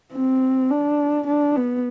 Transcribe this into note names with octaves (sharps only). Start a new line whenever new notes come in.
C4
D4
D4
B3